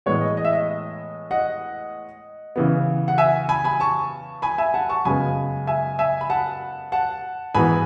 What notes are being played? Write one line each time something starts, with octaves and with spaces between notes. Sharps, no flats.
A2 E3 G#3 B3 C#5
D#5
D#5
E5
D#5
D#5 F#5
C#3 E3 B3
F#5
E5 G#5
G#5 B5
G#5 B5
A5 C#6
G#5 B5
E5 G#5
F#5 A5
A5 C#6
F#2 C#3 G#3 B3 G#5 B5
E5 G#5
E5 G#5
B5
F#5 A5
F#5 A5
G#2 E3 B3 G#5 B5